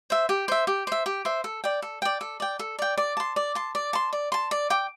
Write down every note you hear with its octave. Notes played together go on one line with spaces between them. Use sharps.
C5 E5
G4
C5 E5
G4
C5 E5
G4
C5 E5
A4
D5 G5
A4
D5 G5
A4
D5 G5
A4
D5 G5
D5
A5 C6
D5
A5 C6
D5
A5 C6
D5
A5 C6
D5
G5 D6